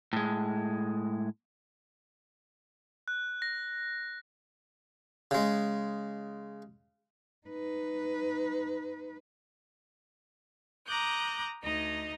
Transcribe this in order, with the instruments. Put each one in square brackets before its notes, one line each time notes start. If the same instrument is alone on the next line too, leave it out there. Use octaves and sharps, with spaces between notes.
[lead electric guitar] A2 G#3
[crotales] F#6
A#6
[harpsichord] C#3 G#3
[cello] D#4 B4
[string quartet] A#5 D6 D#6 F#6 G6
D2 D#4 D#5